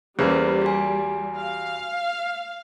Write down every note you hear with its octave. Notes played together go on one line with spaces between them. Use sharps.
E2 C#3 G3 A#3 C#4 B4 C5
F#4 G#5
F5